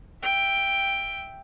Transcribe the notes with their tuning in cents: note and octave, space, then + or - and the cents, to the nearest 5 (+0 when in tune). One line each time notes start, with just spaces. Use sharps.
E5 +0 G5 +5